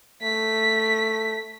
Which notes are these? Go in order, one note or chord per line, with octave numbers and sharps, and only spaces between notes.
A3 B6